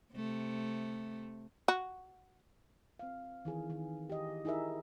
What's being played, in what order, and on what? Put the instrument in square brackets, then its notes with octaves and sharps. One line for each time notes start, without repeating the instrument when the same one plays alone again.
[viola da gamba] C3 A3
[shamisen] F#4
[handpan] C4 F5
D#3 E3 G#4
D#3
G4 D#5
D#4 E4 G#4 A#4 E5